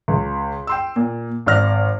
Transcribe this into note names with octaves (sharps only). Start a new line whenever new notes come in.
C#2
G5 C6 E6
A#2
G#1 D5 F6 A#6